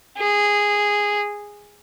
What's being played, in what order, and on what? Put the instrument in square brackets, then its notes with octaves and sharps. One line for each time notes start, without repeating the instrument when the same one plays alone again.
[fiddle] G#4